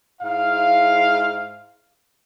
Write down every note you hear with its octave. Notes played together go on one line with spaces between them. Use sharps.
G#2 E4 F5